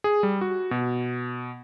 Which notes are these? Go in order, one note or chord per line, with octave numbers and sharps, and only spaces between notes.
G#4
G3
F#4
B2